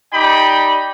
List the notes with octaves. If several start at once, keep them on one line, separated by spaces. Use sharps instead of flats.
D#4 G4 D5 G5 B5